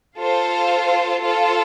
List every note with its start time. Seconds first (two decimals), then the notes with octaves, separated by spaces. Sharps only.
0.20 F4 A4 C5 F5
1.24 F4 A4 C5 F5